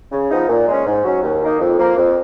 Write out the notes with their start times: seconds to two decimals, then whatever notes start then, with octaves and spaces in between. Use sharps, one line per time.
0.12 C#3
0.30 F3 B3 D#4
0.49 A#2
0.68 G#3 C#4
0.86 G#2
1.05 F#3 C#4
1.23 D#2
1.41 D#3 A#3 D#4
1.61 F2
1.79 F3 A#3
1.97 F2